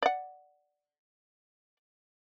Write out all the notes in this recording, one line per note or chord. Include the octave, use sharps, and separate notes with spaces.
D5 F#5